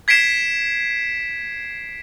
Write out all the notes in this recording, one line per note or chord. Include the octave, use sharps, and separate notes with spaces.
G#6 B6 C7 D7 E7